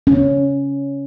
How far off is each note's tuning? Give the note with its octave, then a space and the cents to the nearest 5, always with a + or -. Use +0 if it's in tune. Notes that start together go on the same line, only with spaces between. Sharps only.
C#4 +5